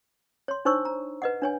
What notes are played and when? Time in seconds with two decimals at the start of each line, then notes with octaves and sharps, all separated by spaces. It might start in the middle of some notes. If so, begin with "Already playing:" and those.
0.48 C#5 C6
0.65 D4 D#4 C5 C#5 C#6 E6
0.85 A#5
1.22 B4 D#5 F#5
1.42 D4 C#5 G#5